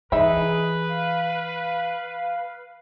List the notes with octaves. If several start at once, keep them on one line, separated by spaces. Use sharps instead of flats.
E3 D#4 G#4 B4 E5 B5
F5